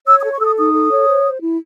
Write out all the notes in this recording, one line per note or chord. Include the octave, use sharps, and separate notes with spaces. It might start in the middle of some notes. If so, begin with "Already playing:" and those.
C#5 E6
D#6
A4
C#6
A4 D#6 E6
D#4 D#6
A4
C#5
C5
C5
E4